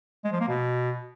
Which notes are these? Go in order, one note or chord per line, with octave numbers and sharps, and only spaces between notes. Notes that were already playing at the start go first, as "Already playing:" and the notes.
G#3
F3
A#3
B2